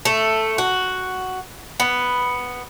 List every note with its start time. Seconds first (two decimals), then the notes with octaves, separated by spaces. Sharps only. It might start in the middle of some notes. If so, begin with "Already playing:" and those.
0.05 A3
0.58 F#4
1.80 B3